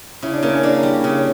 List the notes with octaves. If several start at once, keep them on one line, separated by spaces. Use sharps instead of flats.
C#3 E4
D4
C#3 A#3
C#4
A#3 D4
G3
C#3